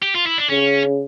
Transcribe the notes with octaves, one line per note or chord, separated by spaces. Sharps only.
G4
F4
E4
D4
C#3 C#4